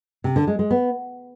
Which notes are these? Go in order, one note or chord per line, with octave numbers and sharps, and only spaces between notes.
C3
D3
G#3
G#3
B3